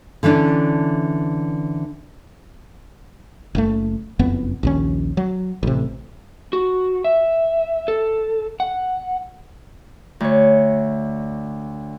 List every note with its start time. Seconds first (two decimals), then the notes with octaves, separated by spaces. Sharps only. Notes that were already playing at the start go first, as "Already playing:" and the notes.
0.23 D3 E3 C#4 D4
3.55 F#1 C3 A3
4.19 F#1 F2 B3
4.63 A#1 D#2 C#4
5.17 F#3
5.63 A1 C3
6.53 F#4
7.04 E5
7.88 A4
8.60 F#5
10.20 D2 C#5